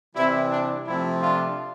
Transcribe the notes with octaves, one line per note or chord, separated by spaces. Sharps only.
C3 E3 G3 C4 E4
D4
C3 F3 A3 C4 E4
D4 F4